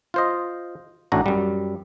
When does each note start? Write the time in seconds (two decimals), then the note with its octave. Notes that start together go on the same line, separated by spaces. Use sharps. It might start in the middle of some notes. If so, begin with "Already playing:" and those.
0.14 F4 C5 D#5
1.12 A1 A2 A3 D4 F#4 A#5
1.26 F#2 G3